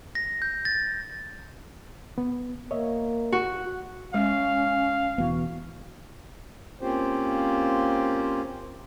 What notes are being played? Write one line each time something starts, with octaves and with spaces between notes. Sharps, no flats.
A#6
G6
A6
B3
A#3 C#5 D#5 E5
F#4
G#3 C#4 F5
E1 E3 B3 F#4
A#3 C4 C#4 F4 G4 C5